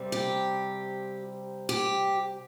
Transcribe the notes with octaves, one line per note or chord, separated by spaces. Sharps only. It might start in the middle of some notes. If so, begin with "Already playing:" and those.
Already playing: C3 G3 C4
G4
G4